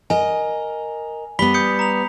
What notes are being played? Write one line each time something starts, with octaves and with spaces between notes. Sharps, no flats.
A#4 D#5 G#5
G3 B3 B5 B6 G7
D#6 G6 C#7
A#5 F7